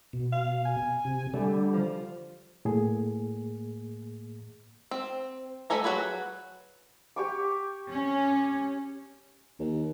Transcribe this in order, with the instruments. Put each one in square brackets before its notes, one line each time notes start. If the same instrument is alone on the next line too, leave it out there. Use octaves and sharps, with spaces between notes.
[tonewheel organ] B2
[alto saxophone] F5
G#5
[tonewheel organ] C3
[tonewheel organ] D3 G3 [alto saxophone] A3
[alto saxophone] F3
[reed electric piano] A2 A#3 G#4
[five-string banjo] C4
G3 A3 A4 G#5 A#5
F#3 G#3 F#4 G#4 B4
[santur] G4 C#6 D6
[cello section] C#4
[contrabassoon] D#2